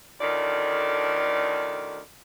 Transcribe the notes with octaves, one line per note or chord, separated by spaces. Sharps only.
D2 A2 D#3 D5